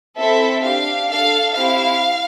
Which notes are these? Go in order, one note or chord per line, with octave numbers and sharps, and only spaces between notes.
C4 E4 A4 E5
D4 G4 F5
D4 A4 F5
C4 E4 G4 F5